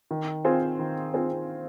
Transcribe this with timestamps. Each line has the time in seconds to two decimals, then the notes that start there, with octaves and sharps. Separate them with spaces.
0.11 D#3
0.45 C4 F4 G#4 C5
0.79 D#3
1.14 C4 F4 G#4 C5